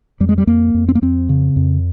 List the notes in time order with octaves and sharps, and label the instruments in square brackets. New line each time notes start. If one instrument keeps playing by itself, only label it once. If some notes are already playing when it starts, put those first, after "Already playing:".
[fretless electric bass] F2 G3
G#3
G3
F2 A#3
F2
C4
A#3
F2 C4
C#3
F2